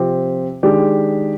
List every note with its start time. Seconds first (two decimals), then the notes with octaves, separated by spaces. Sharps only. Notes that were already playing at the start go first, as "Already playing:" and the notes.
Already playing: C3 F3 C4 G4
0.63 D#3 G#3 D4 G4